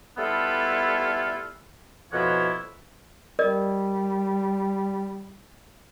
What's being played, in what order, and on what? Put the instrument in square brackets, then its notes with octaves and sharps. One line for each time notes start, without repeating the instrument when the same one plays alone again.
[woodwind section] G3 A3 B3 E4 F4 A4
F2 B2 F3 E4 C#5 F#5
[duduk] G3 [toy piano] A#4 D5 D#5